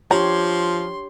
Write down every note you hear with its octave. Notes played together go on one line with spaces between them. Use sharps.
F3 D4 G4 C#5 A#5 C6